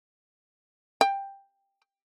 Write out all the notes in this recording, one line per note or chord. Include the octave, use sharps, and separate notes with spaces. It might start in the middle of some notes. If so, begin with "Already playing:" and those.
G5